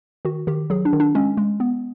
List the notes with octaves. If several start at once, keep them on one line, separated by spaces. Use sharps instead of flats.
D#3 F#4
D#3 G4
F#3 G#4
D4
D#3
D4
G#3 C#4
G#3
B3